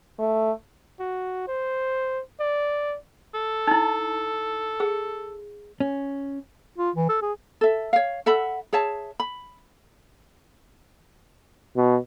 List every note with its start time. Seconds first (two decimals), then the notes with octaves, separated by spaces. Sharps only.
0.19 A3
1.00 F#4
1.48 C5
2.40 D5
3.34 A4
3.67 D#4 E4
4.80 G#4
5.80 C#4
6.78 F4
6.96 E3
7.09 A4
7.22 G#4
7.61 A4 E5
7.93 C#5 F5
8.26 A4 E5 F#5 B5
8.73 G#4 C#5 E5 A5
9.20 B5
11.77 B2